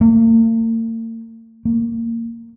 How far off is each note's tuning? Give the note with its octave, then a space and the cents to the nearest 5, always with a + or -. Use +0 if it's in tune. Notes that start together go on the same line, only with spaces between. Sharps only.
A#3 -45
A#3 -15